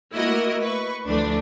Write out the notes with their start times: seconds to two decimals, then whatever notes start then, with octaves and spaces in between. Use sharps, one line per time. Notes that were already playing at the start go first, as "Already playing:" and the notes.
0.13 A3 A#3 E4 F#4 A#4 D#5
0.61 B4 C#6
1.07 D2 E3 F3 A3 D4